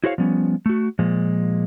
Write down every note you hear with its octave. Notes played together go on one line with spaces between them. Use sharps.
E4 F#4 G#4 C5 C#5 F5
F3 G3 B3 C#4
A3 F#4
A#2 F3 G#3